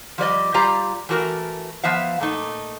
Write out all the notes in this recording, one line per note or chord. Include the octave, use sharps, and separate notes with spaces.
F3 G3 D5 D#5
G3 F4 G4 D5 F5 A#5
E3 A3 F#4 A4 A#4
F3 B3 E5 F5
A#2 A3 D#4